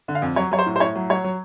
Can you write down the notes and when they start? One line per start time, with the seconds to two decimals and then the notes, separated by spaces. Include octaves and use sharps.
0.08 D3
0.15 F5
0.22 F2
0.36 F#3 C#5
0.51 F#3 C#5
0.59 C5
0.66 A2
0.76 C5
0.80 A2 C#5
0.95 F#3
1.10 F#3 C#5
1.24 F#3